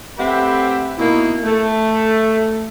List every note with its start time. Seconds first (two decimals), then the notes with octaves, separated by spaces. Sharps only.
0.18 A3 C4 G4 B4 E5 F#5
0.99 B2 A#3 D#4 E4
1.44 A3